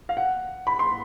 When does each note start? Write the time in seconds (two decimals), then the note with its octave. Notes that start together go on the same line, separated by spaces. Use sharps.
0.09 F5
0.17 F#5
0.67 B5
0.79 C6